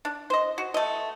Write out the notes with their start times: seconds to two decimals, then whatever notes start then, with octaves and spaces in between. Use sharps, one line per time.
0.05 D4
0.30 C5 D#5
0.58 F#4
0.74 A3 D#5